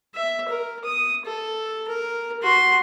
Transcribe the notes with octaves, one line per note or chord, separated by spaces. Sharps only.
E5
A#4
D#6
A4
A#4
F#4 C6